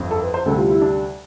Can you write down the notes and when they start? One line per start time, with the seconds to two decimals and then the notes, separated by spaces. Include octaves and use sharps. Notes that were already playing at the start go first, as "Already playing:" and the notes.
Already playing: G1 F2 D3
0.11 A4
0.22 B4
0.34 C5
0.46 D2 C3 G3 A4
0.58 F4
0.70 E4
0.82 D4